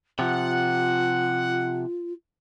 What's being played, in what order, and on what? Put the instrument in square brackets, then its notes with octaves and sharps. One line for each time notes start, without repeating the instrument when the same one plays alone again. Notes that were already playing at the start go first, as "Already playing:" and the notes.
[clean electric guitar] C3 F3 [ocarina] F4 [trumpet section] F#5